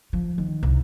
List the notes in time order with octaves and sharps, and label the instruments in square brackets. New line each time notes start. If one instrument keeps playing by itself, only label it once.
[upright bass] F3
D#3
C2